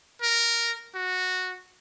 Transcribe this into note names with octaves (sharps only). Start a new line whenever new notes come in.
A#4
F#4